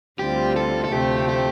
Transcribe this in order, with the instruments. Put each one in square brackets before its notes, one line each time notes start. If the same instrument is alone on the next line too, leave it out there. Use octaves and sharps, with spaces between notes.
[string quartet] D2 D3 G3 C4 F4 [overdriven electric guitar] G4
[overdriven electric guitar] A4
A4
[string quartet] D2 C3 F3 A3 C4 [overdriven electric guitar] G4
[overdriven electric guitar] G4